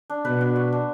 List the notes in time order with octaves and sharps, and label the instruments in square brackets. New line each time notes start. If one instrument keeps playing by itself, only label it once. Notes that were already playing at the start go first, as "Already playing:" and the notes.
[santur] D4
[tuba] B2 [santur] B4
[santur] D4
F#4
D4